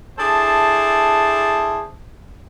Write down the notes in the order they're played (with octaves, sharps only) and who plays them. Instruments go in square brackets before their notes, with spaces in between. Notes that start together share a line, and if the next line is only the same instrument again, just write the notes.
[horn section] D4 E4 G#4 A4 C5